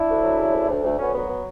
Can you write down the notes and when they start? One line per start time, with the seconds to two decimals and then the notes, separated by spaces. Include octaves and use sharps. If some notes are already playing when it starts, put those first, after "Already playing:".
Already playing: D4 E4
0.09 D2
0.24 F#3
0.39 C#3
0.54 D2
0.70 D2
0.84 D2
0.99 D2 B3 C#4
1.14 F#3 B3
1.29 B3